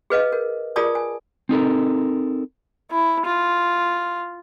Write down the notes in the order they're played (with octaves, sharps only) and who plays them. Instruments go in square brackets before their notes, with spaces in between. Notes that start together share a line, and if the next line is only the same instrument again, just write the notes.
[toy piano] G#4 B4 D#5 F5
A#4
F4 G#4 A#4 D5 A5 D#6
G#5
[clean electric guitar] C4 D#4 A4 A#4
[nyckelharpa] E4
F4